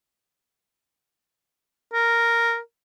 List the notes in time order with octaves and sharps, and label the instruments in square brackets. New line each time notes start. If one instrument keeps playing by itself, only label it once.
[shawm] A#4